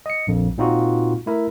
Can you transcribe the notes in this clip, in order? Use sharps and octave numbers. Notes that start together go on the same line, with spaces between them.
D#5 C#7
A#1 F2
A#2 C4 D#4 F4 F#4
A3 E4 A#4